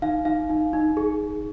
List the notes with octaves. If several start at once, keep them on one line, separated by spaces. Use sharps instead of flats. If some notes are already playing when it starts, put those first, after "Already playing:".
D#4 F5
D#4 F5
D#4
D#4
G#4